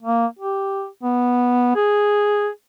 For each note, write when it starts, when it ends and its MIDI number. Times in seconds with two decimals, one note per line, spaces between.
0.03 0.26 58
0.39 0.86 67
1.03 1.74 59
1.76 2.49 68